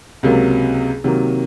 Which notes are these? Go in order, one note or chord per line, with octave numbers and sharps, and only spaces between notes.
C#2 C3 F#3 A#3
C3 D#3 F#3 A#3